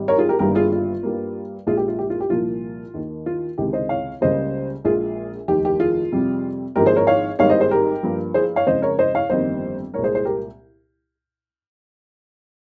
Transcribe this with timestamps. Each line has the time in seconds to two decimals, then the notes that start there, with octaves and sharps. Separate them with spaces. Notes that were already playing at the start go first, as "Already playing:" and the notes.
Already playing: G#1 G#2 G3
0.08 A#4 C#5
0.18 F4 G#4
0.29 G4 A#4
0.39 G1 G2 D#3 G3 A#3 G4 A#4
0.55 F4 G#4
0.72 F4
1.03 G2 G3 A#3
1.67 A#1 A#2 G#3 F4 G#4
1.77 G4
1.88 F4
1.99 G4
2.10 F4
2.21 G4
2.30 C2 A#2 F3 A#3 F4
2.94 D#2 D#3 A#3
3.26 F4
3.58 C#2 C3 D#3 G#3 G4
3.73 C5 D#5
3.89 C#5 F5
4.21 C#2 C#3 G3 A#3 C5 D#5
4.84 A#1 A#2 G#3 F4 G#4
5.48 F1 D#2 D#3 G4
5.65 G4
5.80 F4 G#4
6.12 F2 C3 G3
6.76 G#1 G#2 F3 A#3 G4 A#4
6.86 G#4 C5
6.96 A#4 C#5
7.07 C#5 F5
7.39 G#1 G#2 G3 A#3 C#5 F5
7.50 C5 D#5
7.60 G#4 C5
7.71 G4 A#4
8.03 G2 F3 A#3
8.34 G#4 C5
8.56 C#5 F5
8.67 F2 C#3 G#3 C5 D#5
8.82 A#4 C#5
8.99 C5 D#5
9.15 C#5 F5
9.30 G1 F2 D#3 G3 A#3 C5 D#5
9.94 C2 A#2 G#3 A#4 C#5
10.04 G#4 C5
10.15 G#4 C5
10.25 G4 A#4